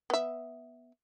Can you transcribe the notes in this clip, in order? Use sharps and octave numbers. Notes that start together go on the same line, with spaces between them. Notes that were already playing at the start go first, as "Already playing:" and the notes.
B3 E5